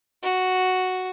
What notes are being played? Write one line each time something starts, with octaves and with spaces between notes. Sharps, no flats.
F#4